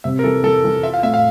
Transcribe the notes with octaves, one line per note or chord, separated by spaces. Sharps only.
C3 E5
A#4
E3 A4
E3 A4
E3
F4 E5
F5
A2 E5
F5